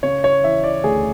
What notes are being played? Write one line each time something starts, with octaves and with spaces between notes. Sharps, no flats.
C#3 C#5
C#5
E3 E5
D5
D2 G#4